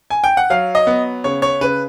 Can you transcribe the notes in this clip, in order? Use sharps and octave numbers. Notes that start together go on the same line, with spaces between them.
G#5
G5
F#5
F#3 F5
D#5
B3
C#3 C#5
C#5
C#3 B4